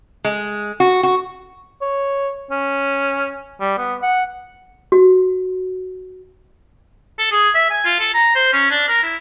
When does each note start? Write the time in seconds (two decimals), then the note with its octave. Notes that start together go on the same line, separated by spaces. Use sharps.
0.24 G#3
0.80 F#4
1.03 F#4
1.82 C#5
2.51 C#4
3.60 G3
3.77 B3
4.02 F#5
4.92 F#4
7.18 A4
7.31 G#4
7.55 E5
7.70 G#5
7.85 F4
7.99 A4
8.14 A#5
8.35 C5
8.53 C#4
8.70 D4
8.88 A#4
9.03 E4